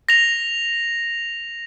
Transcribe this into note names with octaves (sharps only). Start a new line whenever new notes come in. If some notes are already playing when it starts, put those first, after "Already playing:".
A#6 F7